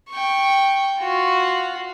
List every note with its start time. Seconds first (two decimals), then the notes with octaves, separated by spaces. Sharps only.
0.10 G5 C#6
1.00 F4 F#4